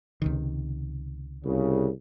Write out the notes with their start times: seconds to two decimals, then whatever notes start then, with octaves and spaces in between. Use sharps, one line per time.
0.22 C#2 C3 D#3
1.44 C2 C#3